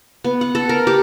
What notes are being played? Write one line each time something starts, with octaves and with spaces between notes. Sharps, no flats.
B3
F#5
A4
A#4
G4